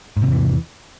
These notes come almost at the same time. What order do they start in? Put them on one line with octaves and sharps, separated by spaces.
G#2 C3 E2 E3